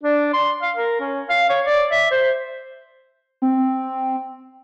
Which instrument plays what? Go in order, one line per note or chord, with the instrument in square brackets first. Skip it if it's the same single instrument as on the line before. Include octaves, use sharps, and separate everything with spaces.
[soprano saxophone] D4
C6
F5
A#4
C#4
F5
C#5
D5
E5
C5
[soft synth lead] C4